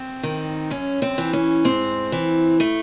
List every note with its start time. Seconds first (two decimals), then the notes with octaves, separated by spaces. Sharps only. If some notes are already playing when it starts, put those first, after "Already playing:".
Already playing: C4
0.23 D#3
0.71 F#2 C#4
1.02 C4
1.18 E3
1.33 C#4
1.65 G#2 C4
2.12 E3
2.60 A3